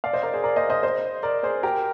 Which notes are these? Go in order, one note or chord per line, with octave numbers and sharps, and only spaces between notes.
D5 F5
C5 D#5
A#4 D5
G#4 C5
A#4 D5
C5 D#5
C5 D#5
C5 D#5
A#4 D5
G#4 C5
G4 A#4